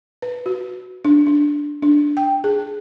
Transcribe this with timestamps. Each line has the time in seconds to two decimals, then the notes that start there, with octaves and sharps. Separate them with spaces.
0.22 B4
0.46 F#4
1.05 D4
1.27 D4
1.82 D4
2.17 G5
2.44 G#4